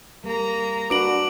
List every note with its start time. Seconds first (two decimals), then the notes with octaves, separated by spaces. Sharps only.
0.24 G3 A#3 A#5
0.90 D4 F#4 B4 D6 D7 F#7